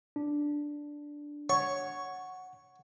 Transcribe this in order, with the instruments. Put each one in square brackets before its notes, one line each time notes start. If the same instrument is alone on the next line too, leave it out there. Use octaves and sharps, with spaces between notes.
[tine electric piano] D4
[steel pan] C#5 [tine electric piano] F#5 [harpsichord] C#6